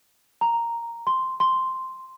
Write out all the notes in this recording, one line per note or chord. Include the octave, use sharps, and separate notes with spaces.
A#5
C6
C6